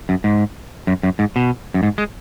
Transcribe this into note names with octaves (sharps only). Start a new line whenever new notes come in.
F#2
G#2
F#2
F#2
G#2
B2
F#2
G#2
G#3